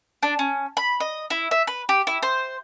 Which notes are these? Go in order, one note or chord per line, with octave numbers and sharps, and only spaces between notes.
D4
C#4
B5
D#5
E4
E5
B4
G4
E4
C5